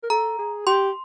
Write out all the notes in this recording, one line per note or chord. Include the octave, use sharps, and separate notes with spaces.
A#4
A4 A#5
G#4
G4 C6